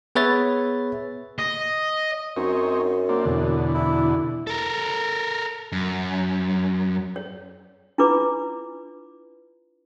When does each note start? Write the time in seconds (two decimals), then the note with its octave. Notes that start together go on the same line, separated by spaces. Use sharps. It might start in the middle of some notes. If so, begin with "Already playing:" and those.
0.15 B3 G#4 B4 C#5 E5 A6
1.39 D#5
2.37 F#2 C4 D#4 C#5
3.09 A#3 C4 D4
3.25 E2 B2 D3
3.74 E4
4.47 A4 A#4
5.72 F#2
7.16 C#5
7.98 D4 E4 F4 B4 D6